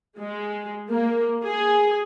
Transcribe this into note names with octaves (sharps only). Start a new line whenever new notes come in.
G#3
A#3
G#4